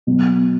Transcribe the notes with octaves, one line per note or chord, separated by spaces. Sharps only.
B2 F#3